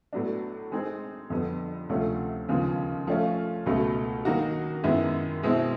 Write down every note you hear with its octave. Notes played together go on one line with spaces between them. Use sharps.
A2 F#3 B3 D4
G#3 C4 D#4 G#4
F2 D3 G3 B3
D2 C3 F3 A3 C#4
D#2 C#3 F3 G#3 B3
F3 A3 C#4 F4
C#2 B2 F#3 A3
D#3 F#3 A#3 D#4 F#4
F#2 D#3 G#3 B3 E4
B2 G#3 C4 E4